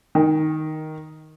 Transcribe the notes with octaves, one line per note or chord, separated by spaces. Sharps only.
D#3